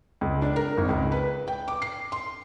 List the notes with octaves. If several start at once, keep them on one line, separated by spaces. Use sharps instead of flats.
C#2
D4
A#4
G#1
C#2
B4
G5
D6
C7
C6